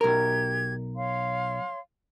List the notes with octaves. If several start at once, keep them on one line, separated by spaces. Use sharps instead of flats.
B1 G4 A#4 G#6
C#5 F5 C6